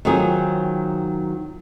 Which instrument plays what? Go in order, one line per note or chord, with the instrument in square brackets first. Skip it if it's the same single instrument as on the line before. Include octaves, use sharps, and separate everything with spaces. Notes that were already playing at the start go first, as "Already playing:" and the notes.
[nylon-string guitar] D#3 F#3 C4 F4 G#4